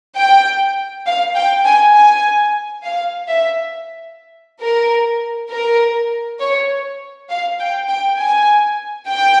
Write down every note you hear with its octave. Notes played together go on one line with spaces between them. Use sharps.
G5
F5
G5
G#5
G#5
F5
E5
A#4
A#4
C#5
F5
G5
G5
G#5
G5